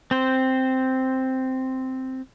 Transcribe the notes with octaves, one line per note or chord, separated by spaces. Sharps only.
C4 C5